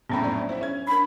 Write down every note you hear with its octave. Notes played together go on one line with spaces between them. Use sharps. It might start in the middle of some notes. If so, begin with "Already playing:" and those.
A#1 F2 A2 B3 C#4 B5
F#3 D5
E4 C5 E5
C#4 G#6
D4 A#4 B5